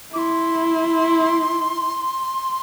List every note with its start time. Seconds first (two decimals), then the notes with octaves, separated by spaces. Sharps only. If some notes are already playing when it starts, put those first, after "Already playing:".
0.13 E4 D6
0.18 C6